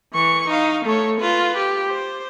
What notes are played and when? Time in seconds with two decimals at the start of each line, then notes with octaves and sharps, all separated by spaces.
0.14 E3 C#6
0.48 D#4 F5
0.85 A3 C#5
1.20 F4 B4
1.56 G4
1.88 C5